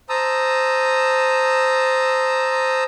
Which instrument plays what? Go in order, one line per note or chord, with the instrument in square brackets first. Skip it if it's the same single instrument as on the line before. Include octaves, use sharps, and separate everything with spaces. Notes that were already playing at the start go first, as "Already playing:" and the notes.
[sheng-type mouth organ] C5 A5 A#5 D#6 E6